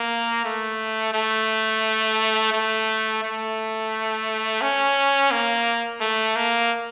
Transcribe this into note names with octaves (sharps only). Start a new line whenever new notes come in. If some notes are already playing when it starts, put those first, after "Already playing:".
Already playing: A#3
A3
A3
A3
A3
C#4
A#3
A3
A#3